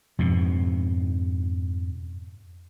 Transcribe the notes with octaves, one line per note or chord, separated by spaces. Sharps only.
F2 G#2 B2